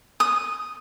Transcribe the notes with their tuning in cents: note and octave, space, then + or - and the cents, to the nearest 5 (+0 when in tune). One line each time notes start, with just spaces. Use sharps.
D#6 -5